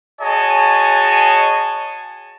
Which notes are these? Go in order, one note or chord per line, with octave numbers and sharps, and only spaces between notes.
F#4 G#4 C#5 D#5 G#5 A5